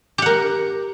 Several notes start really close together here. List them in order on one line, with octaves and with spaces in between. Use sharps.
G4 F#5 A#4